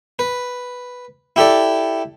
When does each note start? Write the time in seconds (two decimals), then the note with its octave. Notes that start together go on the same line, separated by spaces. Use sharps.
0.19 B4
1.36 E4 G4 A4 D5